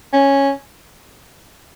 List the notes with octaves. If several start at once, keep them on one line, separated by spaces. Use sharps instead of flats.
C#4